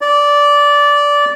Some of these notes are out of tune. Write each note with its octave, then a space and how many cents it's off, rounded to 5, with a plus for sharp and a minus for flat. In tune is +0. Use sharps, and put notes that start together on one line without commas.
D5 -15